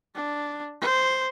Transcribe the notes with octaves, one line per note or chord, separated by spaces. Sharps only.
D4
C5